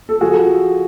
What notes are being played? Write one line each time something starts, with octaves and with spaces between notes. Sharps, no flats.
A4
F3 F#4 G#4